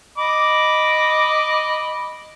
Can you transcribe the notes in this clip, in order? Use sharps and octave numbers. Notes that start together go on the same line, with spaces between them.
D#5 B5 D6